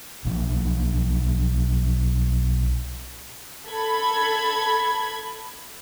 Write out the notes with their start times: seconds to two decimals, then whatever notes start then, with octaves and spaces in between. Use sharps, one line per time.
0.25 B1 A#2 F3
3.68 A4 B5 G#6